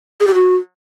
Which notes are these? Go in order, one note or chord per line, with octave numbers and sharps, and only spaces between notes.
G#4
G4
F#4